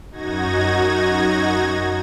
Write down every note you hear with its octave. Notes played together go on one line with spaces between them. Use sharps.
F#2 D#4 F#4 G#6 A#6